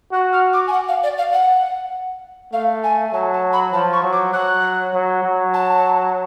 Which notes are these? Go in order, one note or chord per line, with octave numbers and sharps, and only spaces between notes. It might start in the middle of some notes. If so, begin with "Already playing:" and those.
F#4 F#6
F6
D6
G#5
F#5
F5
D5
F5
F#5
A3 F5
G#5
F#3 A5
A5
B5
F3 A5
C#6
F#3
D6
F#3 F#6
F#3
F#3
A5